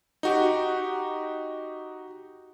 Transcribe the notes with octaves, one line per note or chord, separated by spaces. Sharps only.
D#4 F#4 G4